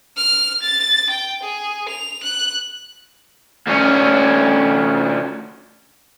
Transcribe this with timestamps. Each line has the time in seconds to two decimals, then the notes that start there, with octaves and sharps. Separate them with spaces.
0.17 F6
0.62 A6
1.10 G5
1.43 G#4
1.88 F7
2.23 F#6
3.67 D2 C#4